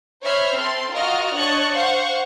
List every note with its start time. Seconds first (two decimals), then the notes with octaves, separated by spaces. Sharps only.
0.22 C5 C#5 E5 B5 F6
0.57 C4 A4 C6
0.92 F4 F#4 A#4 D#5 F6
1.34 D4 C#5 D#5 A5 C#6 F#6
1.73 C5 F5 F#5 C#6 G6